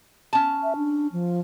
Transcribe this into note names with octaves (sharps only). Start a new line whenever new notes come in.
C#4 A5
E5
D4
F3